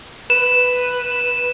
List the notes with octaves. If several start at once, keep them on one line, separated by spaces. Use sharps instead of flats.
B4 E7